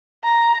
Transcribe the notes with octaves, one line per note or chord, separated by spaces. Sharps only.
A#5